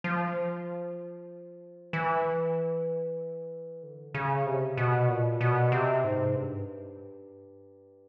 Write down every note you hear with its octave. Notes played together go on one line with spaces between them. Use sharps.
F3
E3
D3
C#3
C3
B2
A#2
B2
C3
G#2
G2